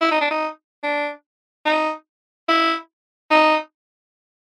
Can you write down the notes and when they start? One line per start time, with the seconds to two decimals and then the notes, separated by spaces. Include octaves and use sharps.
0.01 E4
0.11 D#4
0.21 D4
0.31 D#4
0.83 D4
1.66 D#4
2.49 E4
3.31 D#4